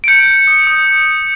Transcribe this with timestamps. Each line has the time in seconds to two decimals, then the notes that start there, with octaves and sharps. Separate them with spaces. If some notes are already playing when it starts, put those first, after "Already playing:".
0.04 D7
0.08 G6 C#7
0.28 G6
0.47 D#6
0.67 D#6